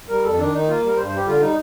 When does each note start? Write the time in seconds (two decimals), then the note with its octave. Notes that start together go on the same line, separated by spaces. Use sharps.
0.09 G3 A#4
0.24 F2 A4
0.38 D#3 D4
0.53 D#3 D#4
0.68 A#3 F4
0.83 G3 A#4
0.97 G2 C5
1.07 G3 C5
1.16 G4
1.26 D3 F4
1.40 G3 D#4